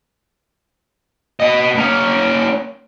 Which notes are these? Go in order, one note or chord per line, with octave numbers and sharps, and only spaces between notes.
B3 D#5
A#3 C#4